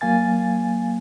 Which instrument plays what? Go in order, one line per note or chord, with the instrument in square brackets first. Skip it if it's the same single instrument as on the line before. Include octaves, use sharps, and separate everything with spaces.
[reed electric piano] F#3 A#3 F5 G#5 A6